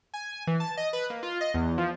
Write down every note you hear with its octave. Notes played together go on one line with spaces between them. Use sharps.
G#5
E3
A5
D#5
B4
A#3
F4
D#5
E2
F3